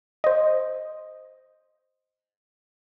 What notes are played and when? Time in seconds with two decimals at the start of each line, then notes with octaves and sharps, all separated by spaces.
0.24 C5 D#5